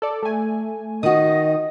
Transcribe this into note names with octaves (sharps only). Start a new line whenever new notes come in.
A4 D5
A3 G#5
D#3 F#4 D#5 D#6